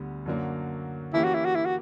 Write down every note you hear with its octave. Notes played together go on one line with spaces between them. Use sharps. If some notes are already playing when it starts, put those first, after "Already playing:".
Already playing: D2 D3 G3 B3
F#2 D3 F#3 A#3
E3 A#3 C#4 E4 G4
F#4
E4
F#4
E4
F#4